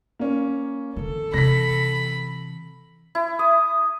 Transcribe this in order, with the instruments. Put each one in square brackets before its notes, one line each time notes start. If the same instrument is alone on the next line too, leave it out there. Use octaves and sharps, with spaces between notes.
[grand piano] A#3 C#4
[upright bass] D3 E3 [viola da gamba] A4
[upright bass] C3 E3 [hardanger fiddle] B5 [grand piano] A#6 B6
[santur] E4
D#6